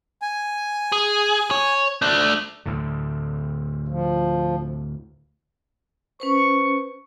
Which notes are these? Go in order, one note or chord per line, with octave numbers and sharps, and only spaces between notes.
G#5
G#4
C#5
A3 D4
D2 A2 D3
F3
C#4 B4 C5 C#6